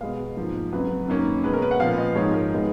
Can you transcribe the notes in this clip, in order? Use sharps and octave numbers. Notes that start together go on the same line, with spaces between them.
B2 G#3 B3 F5
G#2 F3 A#3
F2 C#3 F#3 B4
F#2 D#3 A#3 C#4
B2 G#3 C#4 B4
A#4
B4
F#5
A#2 F3 B3 F5
D#5
G#2 F3 G#3 C#5
A#4
D#3 G#3 B3